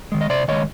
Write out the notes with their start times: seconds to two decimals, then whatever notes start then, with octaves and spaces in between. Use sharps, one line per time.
0.12 D#3 G#3
0.21 D#5
0.30 C3 C5 D5
0.48 D#3 G#3 C#5 D#5